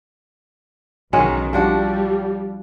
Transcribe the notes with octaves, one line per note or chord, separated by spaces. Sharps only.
B1 D#3 G#3 C#4 F#4
F3 G3 D4 F#4